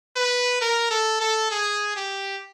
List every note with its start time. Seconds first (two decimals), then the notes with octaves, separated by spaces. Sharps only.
0.16 B4
0.61 A#4
0.91 A4
1.21 A4
1.51 G#4
1.96 G4